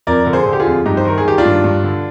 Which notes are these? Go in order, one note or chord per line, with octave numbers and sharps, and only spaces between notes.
F2 A#4 D5
D3 A#4
G#4 C5
D3
G4
F4 G#4
F2
G2 D#4 G4
C5
D#3 A#4
G#4
D#3 G4
D4 F4
G2
G2
D3